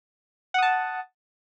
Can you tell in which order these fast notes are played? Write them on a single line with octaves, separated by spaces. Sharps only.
F#5 D#6 A5